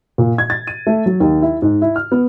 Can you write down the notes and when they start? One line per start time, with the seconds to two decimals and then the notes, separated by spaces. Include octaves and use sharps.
0.18 A#2
0.38 G#6
0.50 A6
0.67 D#7
0.87 A3
1.06 F#3
1.20 D#2
1.42 E4
1.62 G#2
1.82 E4
1.96 F6
2.12 B3